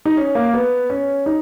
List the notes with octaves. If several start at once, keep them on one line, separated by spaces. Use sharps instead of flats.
D#4
C#4
A#3
B3
C#4
D#4